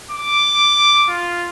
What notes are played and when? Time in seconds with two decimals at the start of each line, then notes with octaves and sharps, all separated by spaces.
0.11 D6
1.10 F4